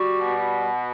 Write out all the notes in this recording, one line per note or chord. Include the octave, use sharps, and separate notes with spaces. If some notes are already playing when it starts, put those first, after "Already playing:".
Already playing: G3 F#4
B2